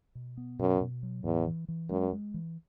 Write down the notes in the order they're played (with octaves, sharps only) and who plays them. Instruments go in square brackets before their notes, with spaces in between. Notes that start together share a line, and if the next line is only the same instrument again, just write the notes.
[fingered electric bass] B2
B3
[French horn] F#2 [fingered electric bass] B2
[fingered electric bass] B2
F#3
[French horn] E2 [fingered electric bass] A2
[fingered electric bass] E3
E3
[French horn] F#2 [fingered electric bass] G#3
[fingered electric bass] G#3
E3